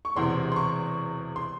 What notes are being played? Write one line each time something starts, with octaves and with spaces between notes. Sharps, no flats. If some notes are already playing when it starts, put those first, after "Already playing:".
C#6
E1 E2 C3 C6
C6
C#6
C6